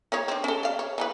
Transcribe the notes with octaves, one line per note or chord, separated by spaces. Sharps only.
D#4 F4 C#5
C4 D4
C#4 A4
D5 F5
C#5
E3 D#4 B4